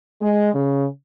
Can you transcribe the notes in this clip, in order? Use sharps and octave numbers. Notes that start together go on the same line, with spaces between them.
G#3
C#3